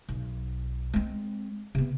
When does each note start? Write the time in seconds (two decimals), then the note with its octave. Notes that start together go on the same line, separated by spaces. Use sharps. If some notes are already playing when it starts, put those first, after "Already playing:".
0.09 B1
0.93 G#3 C4
1.75 C3 B3